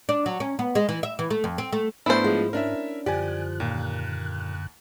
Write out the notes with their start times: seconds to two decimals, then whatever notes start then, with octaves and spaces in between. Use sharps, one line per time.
0.09 D4
0.26 F#3
0.40 C#4
0.59 B3
0.75 G#3
0.89 E3
1.03 E5
1.19 E3
1.30 A3
1.44 F2
1.58 C4
1.72 A3
2.06 G#2 A3 B3 D4 E4 C5
2.24 F3 G#3 F4
2.53 C#4 D4 A#4 E5
3.06 F#2 D3 F3 G4 D5 G#5 F#6
3.60 D#2 A#2